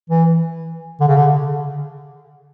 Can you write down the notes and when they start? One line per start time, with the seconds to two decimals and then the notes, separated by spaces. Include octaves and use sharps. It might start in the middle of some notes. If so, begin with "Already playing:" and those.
0.10 E3
1.01 D3
1.08 C#3
1.16 D3